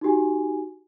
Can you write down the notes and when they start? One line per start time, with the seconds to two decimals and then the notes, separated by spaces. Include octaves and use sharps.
0.01 D#4 F#4 G4 G#5